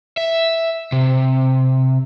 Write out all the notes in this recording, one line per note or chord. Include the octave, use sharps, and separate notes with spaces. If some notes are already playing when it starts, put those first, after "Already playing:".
E5
C3